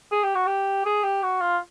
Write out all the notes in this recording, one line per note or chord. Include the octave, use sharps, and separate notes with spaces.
G#4
G4
F#4
G4
G#4
G4
F#4
F4